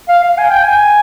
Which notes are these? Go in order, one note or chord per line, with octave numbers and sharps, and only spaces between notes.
F5
F5
G#5
G5
G#5